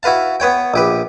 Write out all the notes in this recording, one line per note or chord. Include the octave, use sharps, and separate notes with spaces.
E4 F#4 B4 F5 A5
B3 B4 C#5 G5
A#1 G4 B4